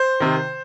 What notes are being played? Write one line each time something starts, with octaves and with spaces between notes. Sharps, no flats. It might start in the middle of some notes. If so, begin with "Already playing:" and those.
Already playing: C5
C3 D#3